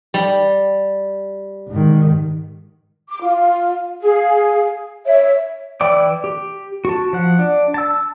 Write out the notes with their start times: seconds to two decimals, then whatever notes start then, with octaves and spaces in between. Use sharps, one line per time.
0.14 G3
1.69 G#2 D#3
3.08 D6
3.21 F4
4.01 G#4 F5
5.06 C#5 E5
5.81 E3 E4 D5 G5 D6
6.24 G4
6.85 F#4 A5
7.13 F3 F#5
7.39 D4
7.74 A5 E6